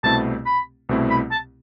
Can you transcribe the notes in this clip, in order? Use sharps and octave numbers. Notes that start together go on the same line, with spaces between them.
C2 B2 A3 C4 E4 A5
B5
C2 B2 A3 C4 E4
B5
A5